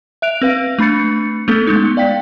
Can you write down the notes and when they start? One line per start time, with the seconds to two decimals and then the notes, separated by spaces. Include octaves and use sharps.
0.22 E5 F#6 D7 F7
0.42 C4 B4 F5
0.78 A3 D4 B5 A6 C#7
1.48 A3 B3 C#4 A4
1.67 G#3 B3 D#4
1.97 D5 F5 G5 B6